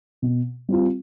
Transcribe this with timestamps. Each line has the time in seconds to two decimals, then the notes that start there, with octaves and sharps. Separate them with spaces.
0.22 B2
0.69 G3 C4 F4